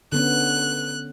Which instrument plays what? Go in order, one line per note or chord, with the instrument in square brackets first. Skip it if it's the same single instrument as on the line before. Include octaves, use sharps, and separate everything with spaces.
[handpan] D3 B3 C#4 [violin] F#6